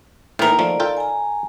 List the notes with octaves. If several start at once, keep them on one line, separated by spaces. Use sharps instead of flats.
A2 D#3 E3 A#3 A#4
F3 A3 D5
F4 A4 G5
G#5 A#5